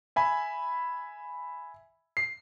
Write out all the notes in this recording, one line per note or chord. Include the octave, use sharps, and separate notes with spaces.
E5 G#5 B5
C7